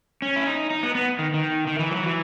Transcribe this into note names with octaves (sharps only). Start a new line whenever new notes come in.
C#4
E4
D#4
D#4
B3
B3
D#3
D#3
D#3
E3
F#3
E3